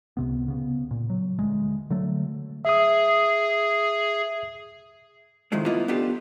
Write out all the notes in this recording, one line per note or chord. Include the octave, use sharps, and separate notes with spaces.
C#2 C3 B3
C#3 B3
A#2
F#3
D2 G#3
D3 F#3 A3
G#4 E5 D#6
C2 A2 D#3 F3 G#3 A3
A#3 B3 E4 F4 D#5
B3 D4 F4 G4 A4